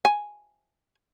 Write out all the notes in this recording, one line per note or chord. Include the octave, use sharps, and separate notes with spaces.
G#5